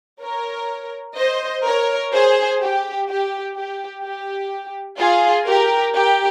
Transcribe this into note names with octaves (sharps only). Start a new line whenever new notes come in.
A#4 C#5
C5 D#5
A#4 C#5
G#4 C5
G4
G4
G4
G4
F4 G#4
G4 A#4
G4 A#4